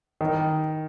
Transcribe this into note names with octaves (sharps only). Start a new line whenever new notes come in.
D#3